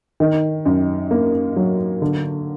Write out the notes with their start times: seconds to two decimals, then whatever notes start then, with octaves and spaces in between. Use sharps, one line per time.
0.20 D#3
0.65 F#2
1.11 A#3
1.56 F#3
2.02 D3